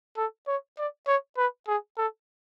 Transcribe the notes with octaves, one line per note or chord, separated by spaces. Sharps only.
A4
C#5
D5
C#5
B4
G#4
A4